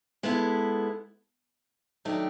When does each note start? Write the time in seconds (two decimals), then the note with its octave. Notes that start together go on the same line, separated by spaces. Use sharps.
0.23 G#3 B3 E4 A4
2.05 D#3 F#3 A3 D4 G4